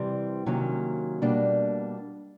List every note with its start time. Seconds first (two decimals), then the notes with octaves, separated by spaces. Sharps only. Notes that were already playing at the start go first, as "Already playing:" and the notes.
Already playing: C3 E3 G3 C4
0.46 C3 D#3 F#3 A#3 C#4
1.22 B2 G3 A#3 D4